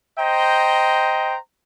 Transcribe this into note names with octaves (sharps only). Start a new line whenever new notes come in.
C5 D#5 G5 A#5